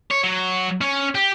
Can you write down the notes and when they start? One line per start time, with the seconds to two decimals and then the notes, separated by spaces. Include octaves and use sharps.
0.11 C#5
0.24 F#3
0.81 C#4
1.15 G4